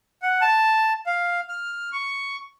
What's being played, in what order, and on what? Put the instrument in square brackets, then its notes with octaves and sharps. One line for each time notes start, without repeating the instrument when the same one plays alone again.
[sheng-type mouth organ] F#5
A5
F5
F6
C#6